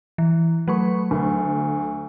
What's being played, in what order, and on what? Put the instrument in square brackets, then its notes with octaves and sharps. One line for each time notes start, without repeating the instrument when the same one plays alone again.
[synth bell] E3
[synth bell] F#3 A3 C#6 [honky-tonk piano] B4
[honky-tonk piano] D2